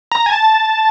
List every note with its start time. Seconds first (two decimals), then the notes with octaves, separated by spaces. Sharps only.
0.12 A#5
0.26 G#5
0.32 A5